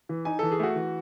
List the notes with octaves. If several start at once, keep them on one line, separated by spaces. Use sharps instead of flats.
E3
D#4 G#5
E3 A4
G#4
A3 F#4
E3